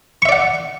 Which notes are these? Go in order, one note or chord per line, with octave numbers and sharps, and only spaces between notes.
D5 E5 F#5 C#6